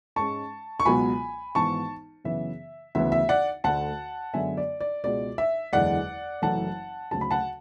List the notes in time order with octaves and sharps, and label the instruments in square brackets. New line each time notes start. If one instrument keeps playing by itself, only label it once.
[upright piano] G#2 G#3 C#4 A5 C#6
C#6
C#2 B2 F#3 B3 G#5 B5
G#1 G#2 E3 B3 A5 C#6
F#2 C#3 E3 B3 E5
D2 C#3 E3 B3 E5
E5
D5 F#5
D2 D3 A3 F#5 A5
F#2 D3 G#3 B3 E5 G#5
D5
D5
C#2 B2 G#3 D5
E5
F#1 E2 D3 G#3 D5 F#5
F#1 F#2 E3 A3 F#5 A5
D2 C#3 F#3 A5
B5
F#5 A5